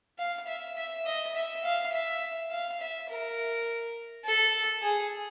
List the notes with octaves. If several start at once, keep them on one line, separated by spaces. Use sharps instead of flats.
F5
E5
E5
D#5
E5
F5
E5
F5
E5
A#4
A4
G#4